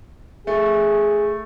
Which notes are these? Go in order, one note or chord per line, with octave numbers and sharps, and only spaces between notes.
A3 G#4